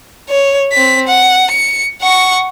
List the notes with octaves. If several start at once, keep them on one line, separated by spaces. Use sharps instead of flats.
C#5
C4 B6
F#5
C#7
F#5 C#6